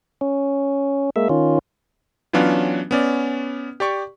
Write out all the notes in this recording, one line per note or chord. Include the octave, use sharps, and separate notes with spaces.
C#4
G#3 A#3 E5
D#3 C#4 F4
E3 F#3 B3 C#4 D4 F4
B3 C#4 D5
G4 D5 C#6